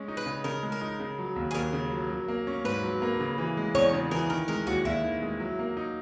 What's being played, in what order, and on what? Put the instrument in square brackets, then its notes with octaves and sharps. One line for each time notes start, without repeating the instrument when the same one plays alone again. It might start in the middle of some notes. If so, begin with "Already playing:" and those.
Already playing: [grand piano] G#3 C#4
D#4
[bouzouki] B4
[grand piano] C#3
[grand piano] C#3 [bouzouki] A#4
[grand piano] G#3
[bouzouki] A#4
[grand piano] D#4
C#3
F#3
D#2
[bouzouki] G#4
[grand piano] D#2 [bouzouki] A#4
[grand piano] C#3
F#3
F#3
A#3
C#4
[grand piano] G#2 [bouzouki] B4
[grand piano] F#3
A#3
C#3
E3
G#3
[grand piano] E2 [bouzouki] C#5
[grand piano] C#3
[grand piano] E3 [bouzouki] A#4
[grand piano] D#3 [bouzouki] A#4
[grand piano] G#3 [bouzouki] A#4
[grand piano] D#2 [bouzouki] F#4
[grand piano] D#2 [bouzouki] E4
[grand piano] D#3
G#3
F#3
A#3
D#4